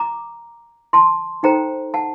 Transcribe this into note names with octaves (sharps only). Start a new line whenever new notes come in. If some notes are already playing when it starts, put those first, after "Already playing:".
Already playing: A#5 D6
A5 C6
D#4 A4 C5 G5 A#5
F#5 A5